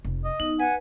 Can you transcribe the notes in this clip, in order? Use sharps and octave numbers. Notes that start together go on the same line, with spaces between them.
F1
D#5
B3 D#4
B4 F#5 G#5